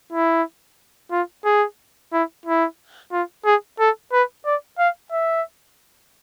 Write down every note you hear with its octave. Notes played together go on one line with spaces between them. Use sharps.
E4
F4
G#4
E4
E4
F4
G#4
A4
B4
D5
F5
E5